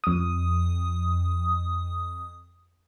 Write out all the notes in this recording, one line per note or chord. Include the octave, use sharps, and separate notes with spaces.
F2 D#6